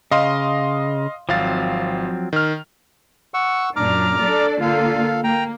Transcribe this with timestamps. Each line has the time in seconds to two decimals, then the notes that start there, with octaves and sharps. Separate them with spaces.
0.11 C#3 D#5 F5 C6
1.29 G#1 F3 F#3 C4 F5 A6
2.33 D#3 F6
3.34 F#5 C#6 E6
3.76 F#2 A#2 D4 A#5 D6 F6
4.20 D4 A4 D5
4.61 D3 A#3 F4 A4 F5
5.24 A#3 G5 A#5